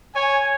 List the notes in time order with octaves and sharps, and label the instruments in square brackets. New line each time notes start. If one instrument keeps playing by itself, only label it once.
[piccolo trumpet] C#5 [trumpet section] G#5